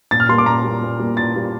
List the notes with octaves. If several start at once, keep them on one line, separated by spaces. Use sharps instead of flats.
A#2 A6
F6
G3 A#3 C6
D6
A#2 A#5
G3 A#3
A#2
G3 A#3
A#2 A6
G3 A#3